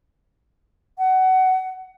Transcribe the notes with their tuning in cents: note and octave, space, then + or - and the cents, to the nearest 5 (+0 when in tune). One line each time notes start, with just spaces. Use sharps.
F#5 +20